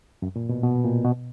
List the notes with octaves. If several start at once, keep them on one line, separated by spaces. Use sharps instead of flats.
F#2
A#2
B2
B2
A#2
B2